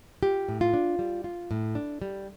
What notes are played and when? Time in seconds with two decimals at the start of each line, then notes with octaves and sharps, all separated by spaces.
0.23 F4 G4
0.49 A2
0.61 F4
0.74 D4
0.99 G3
1.24 F4
1.51 A2
1.75 D4
2.02 G3